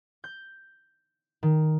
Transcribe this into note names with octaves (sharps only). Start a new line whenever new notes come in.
G6
D#3